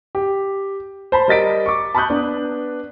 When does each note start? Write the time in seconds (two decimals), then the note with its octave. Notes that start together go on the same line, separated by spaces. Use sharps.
0.15 G4
1.12 C5 A5 B5
1.28 G3 A#4 D#5 A6 B6 D7
1.66 C#6 D6
1.95 A5 B5 C#6 D#6 F#6 G6
2.10 B3 D4 B4